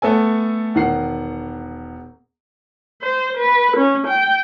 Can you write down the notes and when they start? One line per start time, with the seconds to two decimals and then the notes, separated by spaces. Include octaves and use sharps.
0.02 A3 B3 A4 G#5
0.75 E1 D#3 F#5 C7
3.02 C5
3.37 B4
3.77 C#4
4.07 G5